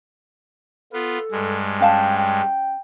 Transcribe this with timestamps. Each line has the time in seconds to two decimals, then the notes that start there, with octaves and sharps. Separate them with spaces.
0.93 B3 F4 A4
1.32 G2 G#3
1.80 C#4 F5 G5 A5
2.18 G5